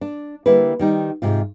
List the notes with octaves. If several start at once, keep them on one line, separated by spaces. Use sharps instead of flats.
D4
D3 G3 A#3 E4 B4
D#3 G3 D#4
G#2 C3 F4